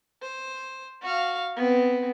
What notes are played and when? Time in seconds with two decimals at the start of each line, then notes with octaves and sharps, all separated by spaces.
0.22 C5
1.02 F#4 F5
1.56 B3 C4